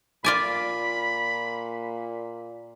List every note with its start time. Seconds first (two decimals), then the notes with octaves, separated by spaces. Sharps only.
0.24 A#2 F4 D5 G#5 B5